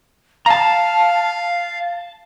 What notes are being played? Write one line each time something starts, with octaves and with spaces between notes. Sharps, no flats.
F5 A5 A#5